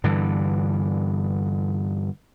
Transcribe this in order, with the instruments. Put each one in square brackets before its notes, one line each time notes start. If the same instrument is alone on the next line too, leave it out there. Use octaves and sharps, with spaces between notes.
[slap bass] G2 D3 E3